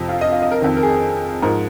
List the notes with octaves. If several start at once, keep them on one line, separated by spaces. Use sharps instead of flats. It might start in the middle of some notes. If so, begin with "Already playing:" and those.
Already playing: F2 C3 F3
F4
D#5
F5
D#5
A#4
F2 D#3
A#4
G#4
G#2 F3 A#4